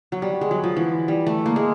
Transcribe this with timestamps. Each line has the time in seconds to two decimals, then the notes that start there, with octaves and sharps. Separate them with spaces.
0.12 F#3
0.22 G3
0.41 G#3
0.51 F#3
0.64 F3
0.76 E3
1.08 G3
1.27 A3
1.46 A#3
1.56 G#3